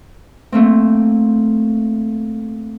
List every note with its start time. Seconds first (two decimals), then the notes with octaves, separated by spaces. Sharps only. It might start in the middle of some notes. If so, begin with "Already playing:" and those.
0.52 A3 A#3 C4